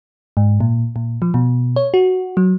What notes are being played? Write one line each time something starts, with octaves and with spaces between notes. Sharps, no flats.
G#2
A#2
A#2
F3
B2
C#5
F#4
F#3